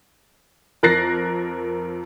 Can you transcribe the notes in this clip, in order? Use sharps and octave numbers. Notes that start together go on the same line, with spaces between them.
F2 A#4 F#6 A6 A#6 C7